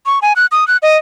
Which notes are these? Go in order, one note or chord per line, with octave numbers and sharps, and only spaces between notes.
C#6
G#5
F#6
D#6
F#6
D#5